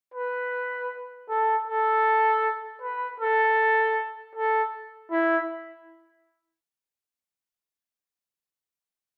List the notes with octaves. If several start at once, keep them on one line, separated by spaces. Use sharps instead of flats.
B4
A4
A4
B4
A4
A4
E4